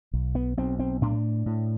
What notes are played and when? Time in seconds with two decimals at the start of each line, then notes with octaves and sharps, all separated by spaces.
0.13 B1
0.35 B3
0.57 B1 C4
0.79 C4
1.01 A2 D4
1.46 A2